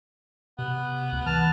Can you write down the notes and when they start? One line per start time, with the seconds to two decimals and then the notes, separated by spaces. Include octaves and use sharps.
0.59 C3 B3
1.12 D2
1.26 E3 A5 F6